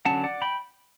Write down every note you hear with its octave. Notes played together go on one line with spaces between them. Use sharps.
D3 F#3 C#4 F#5 A5
D5 F#5
G5 B5